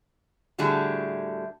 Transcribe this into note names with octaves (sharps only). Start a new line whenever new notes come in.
A2 D3 G3 A3 F#4 G#4